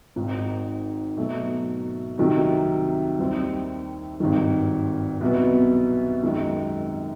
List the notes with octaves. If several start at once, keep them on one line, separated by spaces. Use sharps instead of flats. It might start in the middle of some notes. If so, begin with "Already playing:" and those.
G#1 G#2 D#3
B2 F#3 A3
C2 C3 D#3 F#3 A3
D#2 D#3 G3 C4
G#1 G2 D#3
C2 B2 F#3 B3
F#2 D#3 G#3